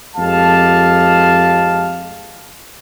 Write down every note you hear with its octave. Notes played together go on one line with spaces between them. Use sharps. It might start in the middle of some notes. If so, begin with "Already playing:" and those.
F2 G#3 G4 F5 A5